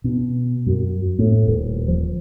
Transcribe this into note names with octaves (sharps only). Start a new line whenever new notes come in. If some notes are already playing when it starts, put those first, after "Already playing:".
B2
F#2
A2
D#1
F3